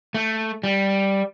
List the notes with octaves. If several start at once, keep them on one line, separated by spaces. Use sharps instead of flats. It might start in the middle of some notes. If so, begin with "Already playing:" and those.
A3
G3